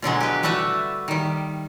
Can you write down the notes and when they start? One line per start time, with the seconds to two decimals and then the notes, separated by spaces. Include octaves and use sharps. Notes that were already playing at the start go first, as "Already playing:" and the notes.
0.02 B2 D3 F#3 G#3
0.21 G4 B4
0.43 G3 A3 D4 F#4 B4 E5
1.08 D#3 G3